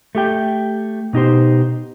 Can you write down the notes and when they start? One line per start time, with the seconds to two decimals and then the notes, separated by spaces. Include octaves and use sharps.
0.15 A3 G4 G5
1.13 B2 D#4 G4 C5